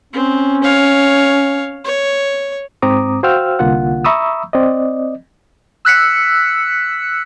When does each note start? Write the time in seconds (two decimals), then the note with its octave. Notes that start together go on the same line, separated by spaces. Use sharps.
0.13 C4 C#4
0.64 C#5 F5
1.85 C#5
2.82 G#2 C4 A#5 D6 D#6
3.23 F#4 C5 F5 G5 E6 F6
3.59 C2 D3 A#3 F4 F#5
4.04 E5 A#5 B5 C#6 D#6 E6
4.53 C4 D5 D#5
5.85 E6 F#6 B6 C#7